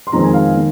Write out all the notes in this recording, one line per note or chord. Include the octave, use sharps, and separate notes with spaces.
C6
F2 D#3 G#3 C4 A#5
G#5
F5
D#3